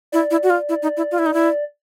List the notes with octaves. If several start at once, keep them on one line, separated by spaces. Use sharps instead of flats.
E4 D5
E4
F#4
F4
E4
D#4
E4
F4
E4
D#4
E4